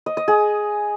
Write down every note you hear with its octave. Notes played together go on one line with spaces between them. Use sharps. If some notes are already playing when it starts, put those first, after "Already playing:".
D#5
D#5
G#4